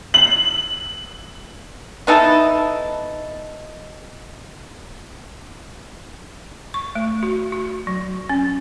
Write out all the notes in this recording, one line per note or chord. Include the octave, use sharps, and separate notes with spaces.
F#7
B3 D#4 E4 A4
C#6
A3
F#4
F#4
F#3
C#4